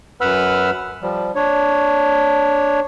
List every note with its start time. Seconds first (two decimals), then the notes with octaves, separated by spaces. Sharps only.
0.21 F#2 B4 F#5 B5 E6 F6
1.02 F3 G3
1.35 D4 C#5